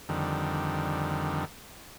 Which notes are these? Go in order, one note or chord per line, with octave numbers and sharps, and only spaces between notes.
F2 D3 D#3 G3